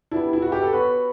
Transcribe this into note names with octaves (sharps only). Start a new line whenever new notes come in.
G3 B3 D4 E4
E4
F#4
G4
A4
B3 F#4 B4 C#5